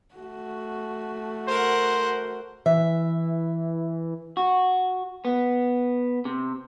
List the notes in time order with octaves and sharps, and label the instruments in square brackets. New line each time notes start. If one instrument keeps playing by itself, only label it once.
[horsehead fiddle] A3 F#4
[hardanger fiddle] A#4 F#5 [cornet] C5
[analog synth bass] E3 [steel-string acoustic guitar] E5
[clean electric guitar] F#4
B3
C3